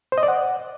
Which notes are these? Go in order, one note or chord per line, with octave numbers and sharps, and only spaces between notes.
C5
D#5
D5
F#5